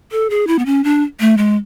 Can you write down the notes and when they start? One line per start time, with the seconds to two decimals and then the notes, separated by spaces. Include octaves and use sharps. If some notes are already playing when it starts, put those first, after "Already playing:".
0.12 A4
0.30 G#4
0.47 E4
0.59 B3
0.66 C#4
0.84 D4
1.20 A3
1.37 G#3